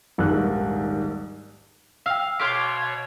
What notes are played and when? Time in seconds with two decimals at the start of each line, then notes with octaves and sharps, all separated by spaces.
0.18 D#1 A#1 G#2 D#3 F#6
2.06 F5 G5 E6
2.40 B2 C5 C#5 F5 D6 B6